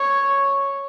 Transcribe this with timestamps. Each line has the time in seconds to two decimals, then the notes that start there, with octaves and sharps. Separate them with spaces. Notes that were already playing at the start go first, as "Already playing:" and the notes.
Already playing: C#5